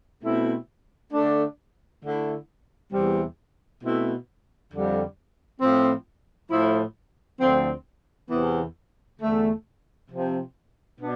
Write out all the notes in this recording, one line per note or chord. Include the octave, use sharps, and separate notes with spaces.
B2 A3 C4 E4
D3 A3 D4
D3 A3 E4
E2 C3 E3 G3
B2 A3 C4 E4
F2 D3 G3
A2 F3 C4
A2 F3 A3 E4
D2 D3 F3 C4
E2 C3 E3 B3
E2 D3 A3
C3 F3 C4
B2 B3 D4